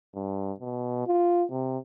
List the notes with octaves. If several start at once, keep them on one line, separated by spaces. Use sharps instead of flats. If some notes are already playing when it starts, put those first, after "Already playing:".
G2
B2
F4
C3